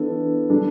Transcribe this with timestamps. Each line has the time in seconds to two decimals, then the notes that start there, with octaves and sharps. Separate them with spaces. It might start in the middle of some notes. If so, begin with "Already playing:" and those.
Already playing: E3 B3 D4 A4
0.49 G3 D4 A4